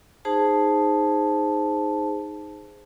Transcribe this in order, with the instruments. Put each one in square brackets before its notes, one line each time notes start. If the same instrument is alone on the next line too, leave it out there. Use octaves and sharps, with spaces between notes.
[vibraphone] D#4 G#4 C5 A5